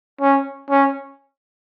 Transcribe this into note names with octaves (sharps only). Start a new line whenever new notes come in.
C#4
C#4